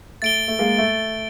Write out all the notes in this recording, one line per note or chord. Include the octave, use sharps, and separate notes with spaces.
A3 A6 D7 G7
A3
G#3 A#3
A3